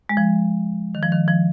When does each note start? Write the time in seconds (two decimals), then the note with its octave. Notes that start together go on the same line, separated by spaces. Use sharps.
0.09 G#3
0.17 F3
0.95 D#3
1.03 F3
1.12 D#3
1.28 F3